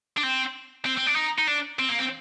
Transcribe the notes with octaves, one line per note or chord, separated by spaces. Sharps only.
D4
C4
C4
C4
D4
D#4
D#4
D4
C4
A#3
C4